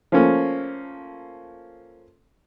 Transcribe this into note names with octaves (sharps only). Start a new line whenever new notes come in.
F3 A3 A#3 C#4